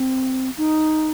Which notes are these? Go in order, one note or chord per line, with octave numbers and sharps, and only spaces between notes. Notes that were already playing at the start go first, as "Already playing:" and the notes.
Already playing: C4
D#4